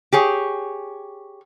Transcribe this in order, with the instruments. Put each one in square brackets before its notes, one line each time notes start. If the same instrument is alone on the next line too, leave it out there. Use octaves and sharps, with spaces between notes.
[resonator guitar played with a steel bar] G4 G#4 C#5